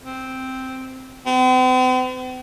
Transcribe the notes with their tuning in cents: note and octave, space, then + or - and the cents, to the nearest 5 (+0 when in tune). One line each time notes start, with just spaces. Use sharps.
C4 -5
C4 -45